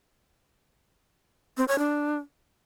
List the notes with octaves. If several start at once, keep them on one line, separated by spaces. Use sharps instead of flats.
C4
C#5
D4